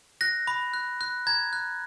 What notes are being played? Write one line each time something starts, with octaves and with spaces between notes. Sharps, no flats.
F#6 A#6
B5
F#6
F#6
A#5 G#6
F#6